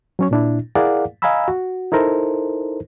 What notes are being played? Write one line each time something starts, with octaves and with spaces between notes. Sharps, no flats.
F#3 C#4 C#5
A#2 D4 E4
E4 G#4 A#4 D5 F5 F#5
D#5 F5 G#5 A#5 B5 E6
F#4
D#4 E4 A4 A#4 C5